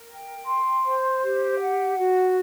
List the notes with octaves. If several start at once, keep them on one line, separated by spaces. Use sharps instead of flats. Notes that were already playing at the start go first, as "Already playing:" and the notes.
Already playing: A#4
G5
C6
C5
G4
F#5
F#4